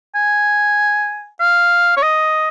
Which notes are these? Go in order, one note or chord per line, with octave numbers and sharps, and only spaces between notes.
G#5
F5
C#5
D#5